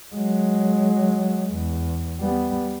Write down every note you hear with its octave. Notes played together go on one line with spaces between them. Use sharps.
F#3 G#3
E2
G3 B3